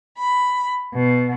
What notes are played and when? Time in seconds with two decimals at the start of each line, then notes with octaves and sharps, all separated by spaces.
0.18 B5
0.93 B2